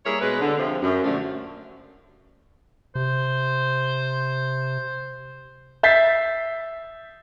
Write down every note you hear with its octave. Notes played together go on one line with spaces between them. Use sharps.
G3 A#3 E4 G#4 A#4 C#5
B2 G#3 B3 C#4 B4
D3
C3 F3
F#2
A#2 D3 F3 G3 A3
C3 C5
E5 G6 A6 B6 C7